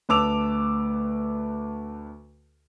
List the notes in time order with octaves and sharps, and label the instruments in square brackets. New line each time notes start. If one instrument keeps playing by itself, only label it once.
[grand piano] D2 B4 A5 D6 E6 F7